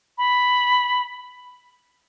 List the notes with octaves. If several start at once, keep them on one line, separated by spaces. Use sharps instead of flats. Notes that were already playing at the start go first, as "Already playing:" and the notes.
B5